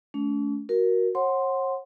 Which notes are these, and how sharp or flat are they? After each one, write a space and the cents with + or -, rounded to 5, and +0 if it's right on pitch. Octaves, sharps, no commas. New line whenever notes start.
A3 -30 C#4 +45
F#4 +0 A#4 +10
C#5 -45 F#5 +0 C6 +0